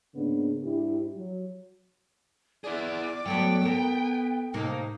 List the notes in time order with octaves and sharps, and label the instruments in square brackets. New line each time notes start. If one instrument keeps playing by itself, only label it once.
[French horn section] G#2 C#3 A#3 B3 D4
G#2 D4 E4 G4
F#3
[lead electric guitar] E4 G#4 [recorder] D5
[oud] F#3 A3 B3 [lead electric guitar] G5
[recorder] B3 [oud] A4 A#4
[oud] A2 C3 A#3 [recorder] D#4